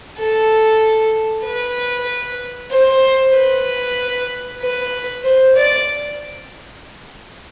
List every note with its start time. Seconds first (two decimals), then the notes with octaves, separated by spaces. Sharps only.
0.19 A4
1.45 B4
2.71 C5
3.34 B4
4.61 B4
5.24 C5
5.56 D5